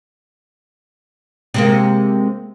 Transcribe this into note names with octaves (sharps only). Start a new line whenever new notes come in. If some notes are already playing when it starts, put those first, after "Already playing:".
C3 G#3 A#3